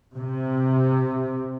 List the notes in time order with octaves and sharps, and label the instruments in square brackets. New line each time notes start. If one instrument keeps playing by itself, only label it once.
[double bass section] C3